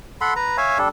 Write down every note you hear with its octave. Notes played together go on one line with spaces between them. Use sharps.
A4 F#5 B5 C6
B4 A#5
C#5 E5 F5 G#5
G3 D4 A4